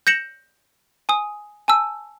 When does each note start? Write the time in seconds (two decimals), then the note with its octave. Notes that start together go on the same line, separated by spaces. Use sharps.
0.07 G6 A#6 C#7 E7 F#7
1.09 G#5 D#6
1.68 G#5 A5 E6